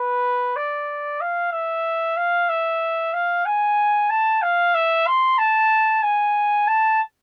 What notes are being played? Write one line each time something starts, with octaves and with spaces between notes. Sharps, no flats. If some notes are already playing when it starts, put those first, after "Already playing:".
Already playing: B4
D5
F5
E5
F5
E5
F5
G#5
A5
F5
E5
C6
A5
G#5
A5